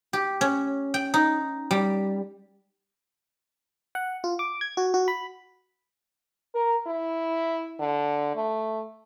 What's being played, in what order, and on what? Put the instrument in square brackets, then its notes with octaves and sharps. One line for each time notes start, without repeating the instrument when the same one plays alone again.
[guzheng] G4
C#4
G5
D#4
G3
[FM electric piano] F#5
F4
D6
G#6
F#4
F#4
B5
[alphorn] A#4
E4
D3
A3